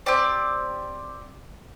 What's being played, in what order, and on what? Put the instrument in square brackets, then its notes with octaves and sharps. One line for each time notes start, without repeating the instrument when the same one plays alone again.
[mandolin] C4 G4 D5